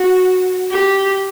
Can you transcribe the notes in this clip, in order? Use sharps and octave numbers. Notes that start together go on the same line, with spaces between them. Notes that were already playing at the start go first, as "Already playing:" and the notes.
Already playing: F#4
G4